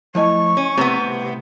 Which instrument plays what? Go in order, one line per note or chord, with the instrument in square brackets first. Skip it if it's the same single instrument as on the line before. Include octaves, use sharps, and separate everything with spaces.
[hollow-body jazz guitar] F3 A3 G#5 [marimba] E4 D#5 [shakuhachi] C#6
[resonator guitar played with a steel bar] C#4
[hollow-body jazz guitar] C2 A2 B4 [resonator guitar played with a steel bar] C3 B3